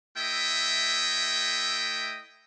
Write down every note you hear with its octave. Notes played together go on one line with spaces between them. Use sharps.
A3 E4 D#5 E5 G5